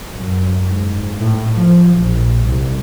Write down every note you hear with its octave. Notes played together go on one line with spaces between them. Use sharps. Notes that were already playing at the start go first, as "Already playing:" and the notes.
F#2
G#2
A2
F3
A#1
C2